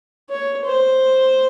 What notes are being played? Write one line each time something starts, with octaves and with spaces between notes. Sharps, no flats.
C#5
C5